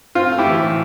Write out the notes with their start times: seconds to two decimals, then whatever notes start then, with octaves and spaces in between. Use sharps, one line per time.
0.15 C4 F4
0.32 A3
0.38 E4 G4
0.47 E3
0.62 A2